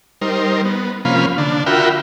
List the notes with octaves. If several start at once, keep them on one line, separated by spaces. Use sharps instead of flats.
G3 D#4 A#4 C5
B3
C3 F3 A#3 C#4 F5 B5
D3 D4
F4 F#4 A#4 E5 G5 B5